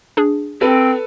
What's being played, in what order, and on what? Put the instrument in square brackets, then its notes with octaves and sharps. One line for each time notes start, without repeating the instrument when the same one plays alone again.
[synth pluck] D4 G#4
[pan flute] C4 [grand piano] A4 B4